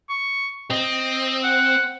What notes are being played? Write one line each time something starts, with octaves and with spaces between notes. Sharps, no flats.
C#6
C4 D#5
F#5